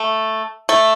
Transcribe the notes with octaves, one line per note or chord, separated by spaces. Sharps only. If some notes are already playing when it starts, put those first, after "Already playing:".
Already playing: A3
A3